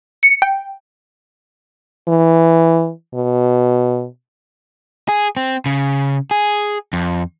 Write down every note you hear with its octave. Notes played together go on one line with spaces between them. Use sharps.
C#7
G5
E3
B2
G#4
C4
C#3
G#4
F2